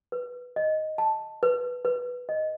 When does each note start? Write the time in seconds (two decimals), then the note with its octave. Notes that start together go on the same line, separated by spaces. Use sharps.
0.12 B4
0.56 D#5
0.98 A5
1.43 B4
1.85 B4
2.29 D#5